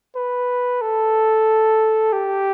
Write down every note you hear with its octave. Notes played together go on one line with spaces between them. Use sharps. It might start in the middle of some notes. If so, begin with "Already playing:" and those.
B4
A4
G4